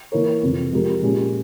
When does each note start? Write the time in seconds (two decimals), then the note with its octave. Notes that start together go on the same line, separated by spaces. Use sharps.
0.12 E3 A#3 E4 A#4 C#5
0.42 F2 C3 E3
0.73 F3 G#3 C4 G4 A#4
1.02 A#2 G#3 C#4 G4